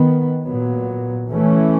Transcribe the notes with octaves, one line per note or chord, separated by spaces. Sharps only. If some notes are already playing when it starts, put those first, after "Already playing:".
Already playing: D#3 B3
A#2 F#3 B3
E3 A3 C#4